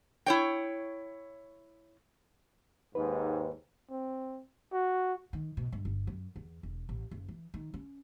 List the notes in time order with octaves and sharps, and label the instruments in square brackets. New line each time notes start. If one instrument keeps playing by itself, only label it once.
[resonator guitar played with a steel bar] E4 C#5 G5
[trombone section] D#2 G#2 [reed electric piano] B4
[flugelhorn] C4
F#4
[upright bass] D#3
B2
G2
G1
F#2
E2
E1
A1
F#1
E3
D#3
C#4